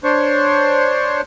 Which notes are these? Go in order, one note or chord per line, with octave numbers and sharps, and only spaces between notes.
D4 C5 C#5